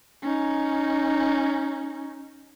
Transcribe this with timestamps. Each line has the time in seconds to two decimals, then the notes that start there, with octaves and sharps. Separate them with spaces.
0.23 C#4 D#4